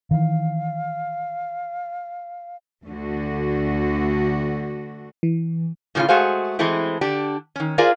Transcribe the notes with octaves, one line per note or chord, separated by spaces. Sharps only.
D#3 E3 F5
D2 D3 F#4
E3
A2 C#3 F#3 C#4 F4
G#3 A3 F#4 G#4 C5 F5
E3 G#3 A3 C4 E4
D3 D4 G4
D#3 C#4
F4 G#4 A#4 C5 D5 F5